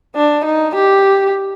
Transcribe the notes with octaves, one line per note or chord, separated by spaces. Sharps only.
D4
D#4
G4